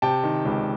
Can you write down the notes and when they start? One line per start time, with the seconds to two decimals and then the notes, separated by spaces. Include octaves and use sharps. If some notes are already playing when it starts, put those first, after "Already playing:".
0.02 C3 G5 A5
0.23 D#3
0.45 C#2